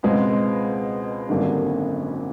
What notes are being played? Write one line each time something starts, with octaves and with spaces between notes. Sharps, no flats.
C#2 B2 G#3 C4
G#1 F#2 D3 G3 A#3